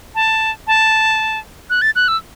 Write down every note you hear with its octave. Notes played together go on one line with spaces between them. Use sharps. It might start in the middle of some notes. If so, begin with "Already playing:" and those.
A5
A5
F#6
A6
F#6
E6